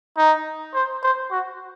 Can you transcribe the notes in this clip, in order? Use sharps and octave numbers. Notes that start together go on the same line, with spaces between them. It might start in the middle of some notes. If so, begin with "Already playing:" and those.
D#4
C5
C5
F#4